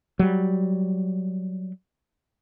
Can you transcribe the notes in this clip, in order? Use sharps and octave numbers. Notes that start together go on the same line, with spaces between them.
F#3 G3